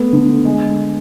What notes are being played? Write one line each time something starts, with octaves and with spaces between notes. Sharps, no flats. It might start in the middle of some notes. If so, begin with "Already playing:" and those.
Already playing: A3 B3
D3
G#3